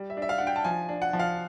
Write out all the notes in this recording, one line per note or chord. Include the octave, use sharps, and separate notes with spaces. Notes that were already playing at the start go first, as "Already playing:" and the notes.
Already playing: G3
E5
D4
E5
F5
D4 F#5
G5
A5
F3 G#5
D4
F#5
F3
F5